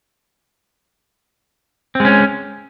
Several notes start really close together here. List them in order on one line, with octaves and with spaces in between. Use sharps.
C4 G#3 C#4